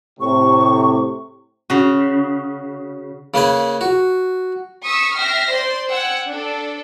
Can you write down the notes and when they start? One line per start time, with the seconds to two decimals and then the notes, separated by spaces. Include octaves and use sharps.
0.20 A2 C3 C#6
1.70 C#3 F#4
3.34 C#3 A#3 B4 G#5
3.81 F#4
4.85 C#6 D#6 E6 B6 C#7
5.17 E5 G5 F6 A#6 C7
5.51 C5 D5 C6
5.88 F#5 G5 E6 F#6 G#6
6.30 D4 A4